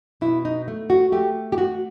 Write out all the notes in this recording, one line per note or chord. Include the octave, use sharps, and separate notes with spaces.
B2 E4
D#4
A3
F#4
A3 G4
G4
A3 F#4